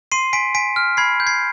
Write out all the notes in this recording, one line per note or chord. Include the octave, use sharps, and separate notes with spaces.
C6 C7 D#7
G#5 B6 D7
G#5 B6 D7
F6
B5 G#6 C7
G6
G#6 C7